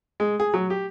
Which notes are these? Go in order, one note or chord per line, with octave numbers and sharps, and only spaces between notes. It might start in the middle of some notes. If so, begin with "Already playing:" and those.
G#3
G#4
F#3
G4